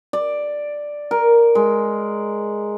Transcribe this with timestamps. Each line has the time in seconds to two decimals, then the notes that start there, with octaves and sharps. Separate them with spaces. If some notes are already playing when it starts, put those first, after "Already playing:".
0.13 D5
1.11 A#4
1.55 G#3